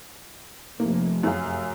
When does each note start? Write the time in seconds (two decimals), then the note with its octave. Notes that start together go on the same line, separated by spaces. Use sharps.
0.80 F1 A#3
1.23 F#2 G#4 F5